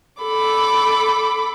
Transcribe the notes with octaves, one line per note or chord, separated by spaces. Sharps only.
A4 B5 D6